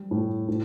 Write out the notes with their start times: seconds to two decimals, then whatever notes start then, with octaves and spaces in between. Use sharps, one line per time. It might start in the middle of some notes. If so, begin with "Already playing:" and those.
Already playing: G3
0.11 A2
0.48 A2